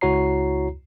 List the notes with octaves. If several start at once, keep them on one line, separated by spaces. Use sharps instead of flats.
C#2 E4 F#4 C#5 A#5 C7